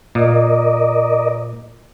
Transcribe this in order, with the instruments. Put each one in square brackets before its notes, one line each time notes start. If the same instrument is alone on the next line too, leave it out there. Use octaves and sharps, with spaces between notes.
[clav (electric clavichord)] A#2 [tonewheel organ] A#4 D5 D#5